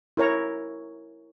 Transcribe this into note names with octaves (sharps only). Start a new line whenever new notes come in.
E4 A#4 C#5 A#5